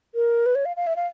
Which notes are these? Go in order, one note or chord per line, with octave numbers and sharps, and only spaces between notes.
A#4
B4
C#5
F5
F5
E5
F5